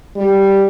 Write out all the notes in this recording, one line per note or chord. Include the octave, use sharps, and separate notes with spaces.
G3